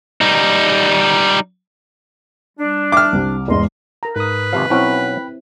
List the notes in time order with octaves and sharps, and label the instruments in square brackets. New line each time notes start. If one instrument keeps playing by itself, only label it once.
[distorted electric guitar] G3 D#4
[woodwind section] G3 D4
[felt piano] E5 [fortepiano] D6 F6
[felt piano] C2 C3
[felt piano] E2 G#2 [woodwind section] D5 D#5 C6
[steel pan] A#4 A#5
[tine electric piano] G#2 D#6 [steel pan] A#4 [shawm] B4
[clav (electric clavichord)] G#1 C3 F3 [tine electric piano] F5
[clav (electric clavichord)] B1 C#4 F#5 [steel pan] C4 E4 C5 [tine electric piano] G5 B5